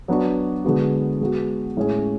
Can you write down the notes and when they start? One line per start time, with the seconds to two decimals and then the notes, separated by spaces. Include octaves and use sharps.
0.08 F#3 B3 D4 F#4
0.65 D3 G#3 B3 F#4
1.21 G#3 B3 F#4
1.77 A2 G#3 C#4 G#4